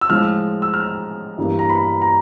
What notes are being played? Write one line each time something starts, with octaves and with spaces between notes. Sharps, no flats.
E6
A2 F3 G#3 F6
E6
F6
G2 E3 G3 A#3
A#5
B5
A#5